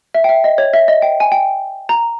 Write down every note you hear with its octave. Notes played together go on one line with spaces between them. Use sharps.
E5
G5
E5
D#5
C#5
E5
D#5
G5
G#5
G5
A#5